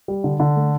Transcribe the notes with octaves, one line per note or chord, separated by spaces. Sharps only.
G3
D3
D3
A3